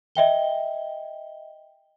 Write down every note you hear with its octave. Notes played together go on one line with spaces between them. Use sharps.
D#5 E5 G5 G7